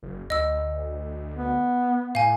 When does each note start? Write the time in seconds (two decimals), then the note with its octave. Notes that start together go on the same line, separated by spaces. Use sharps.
0.02 F#1
0.30 D2 D#5 E6
1.36 B3
2.15 A2 F5 G#5